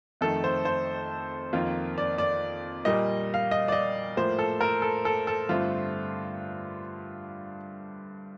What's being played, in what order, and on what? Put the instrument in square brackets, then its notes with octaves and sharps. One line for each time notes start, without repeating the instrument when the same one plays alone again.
[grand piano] F2 D#3 A3 A4
C5
C5
F2 D#3 A#3 F4
D5
D5
A#2 G3 A#3 D#5
F5
D#5
D5
D#5
A2 F3 A#3 C5
A4
A#4
A4
A4
A4
G2 D3 A3 C4 F4